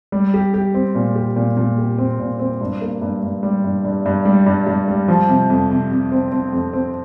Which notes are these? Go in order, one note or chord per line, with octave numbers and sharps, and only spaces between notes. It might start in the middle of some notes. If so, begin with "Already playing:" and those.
G3
G4
G4
C4
A#2
G4
A#2
A#2
G4
C4
A#2
C4
G2
A#3
G2
G2
G3
G2
G2
G2
G3
G2
G2
G3
F3
C3
F2
C3
C3
C4
C4
F2
C4